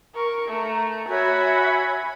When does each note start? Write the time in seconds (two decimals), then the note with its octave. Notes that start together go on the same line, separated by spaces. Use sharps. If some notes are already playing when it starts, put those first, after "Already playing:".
0.14 A#4 C#6
0.48 A3 A#5
1.09 F#4 C#5 E5 G#5 B5